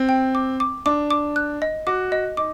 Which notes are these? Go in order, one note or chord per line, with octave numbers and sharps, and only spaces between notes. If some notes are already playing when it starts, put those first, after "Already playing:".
Already playing: C4
G5
D6
D6
D4 D6
D6
F#6
D#5
F#4 D6
D#5
D#4 D6